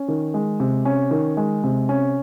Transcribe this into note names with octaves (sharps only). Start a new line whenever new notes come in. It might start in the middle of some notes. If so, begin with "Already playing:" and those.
Already playing: C#4
D#3
G#3
C3
C#4
D#3
G#3
C3
C#4